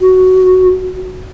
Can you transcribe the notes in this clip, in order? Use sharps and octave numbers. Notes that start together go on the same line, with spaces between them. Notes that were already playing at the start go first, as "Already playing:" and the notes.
F#4